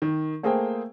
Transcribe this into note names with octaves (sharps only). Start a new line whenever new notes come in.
D#3
A3 A#3 G#4 C5 G5